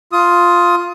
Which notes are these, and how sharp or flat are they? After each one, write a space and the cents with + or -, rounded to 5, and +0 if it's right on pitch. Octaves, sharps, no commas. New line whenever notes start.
F4 +0 D#6 +20